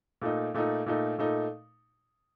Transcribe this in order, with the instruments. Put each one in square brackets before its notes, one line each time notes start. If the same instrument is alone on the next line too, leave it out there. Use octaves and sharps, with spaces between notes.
[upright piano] A#2 A3 D#4
A#2 A3 D#4
A#2 A3 D#4
A#2 A3 D#4